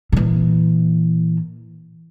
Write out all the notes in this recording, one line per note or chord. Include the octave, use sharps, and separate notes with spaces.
A#2 E3